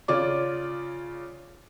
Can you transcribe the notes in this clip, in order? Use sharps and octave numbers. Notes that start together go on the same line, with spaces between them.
C#3 F4 C#5 D5 D6